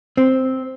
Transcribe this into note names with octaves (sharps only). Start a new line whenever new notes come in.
C4